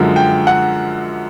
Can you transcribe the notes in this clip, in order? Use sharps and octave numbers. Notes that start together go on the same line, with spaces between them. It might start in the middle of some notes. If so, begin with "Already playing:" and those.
Already playing: F#2 D3 F3 G#3
G5
F#5